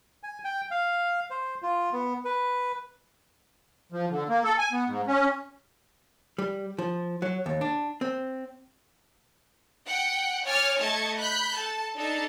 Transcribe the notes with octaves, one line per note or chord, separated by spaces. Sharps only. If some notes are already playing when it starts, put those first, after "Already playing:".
G#5
G5
F5
C5
F4
B3
B4
F3
D3
A#3
A4
G#5
B3
G#2
C#4
G3
F3
F#3
D#2
D4
C4
F#5 G5
C#5 G#5 D6 F6 A6
A3 D#5 A5 C#6 G#6
B5 F#6 G6
A4 A5
D4 D#4 A4 A5